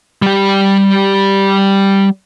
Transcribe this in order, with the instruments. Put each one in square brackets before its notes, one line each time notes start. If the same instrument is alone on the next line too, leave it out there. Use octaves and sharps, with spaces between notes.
[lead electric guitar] G3 G4